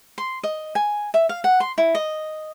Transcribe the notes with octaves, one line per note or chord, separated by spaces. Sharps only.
C6
D#5
G#5
E5
F5
F#5
C6
E4
D#5